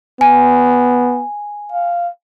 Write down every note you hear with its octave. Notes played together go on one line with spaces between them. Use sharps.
B3 G#5
F5